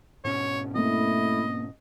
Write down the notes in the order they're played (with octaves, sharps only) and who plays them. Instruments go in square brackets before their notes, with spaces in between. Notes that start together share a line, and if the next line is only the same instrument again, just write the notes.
[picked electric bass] G#2 B2 C#4 [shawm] C#5
[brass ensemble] A3 E4 [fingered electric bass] A#3 C4 [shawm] D#5